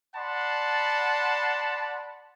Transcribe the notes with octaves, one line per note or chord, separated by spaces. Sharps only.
D5 F#5 A5 B5 C6